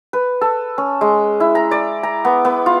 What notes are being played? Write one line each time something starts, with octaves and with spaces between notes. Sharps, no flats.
B4
A4
C#4
G#3
E4
A#5
D5
A#5
B3
B3
F4